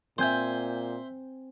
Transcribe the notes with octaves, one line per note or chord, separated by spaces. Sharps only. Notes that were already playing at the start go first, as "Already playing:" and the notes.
A#2 C4 C5 E5 G#5 G6